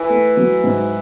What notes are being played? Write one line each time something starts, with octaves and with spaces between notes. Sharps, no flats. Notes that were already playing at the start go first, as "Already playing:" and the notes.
Already playing: E3
A3
F#3
G#2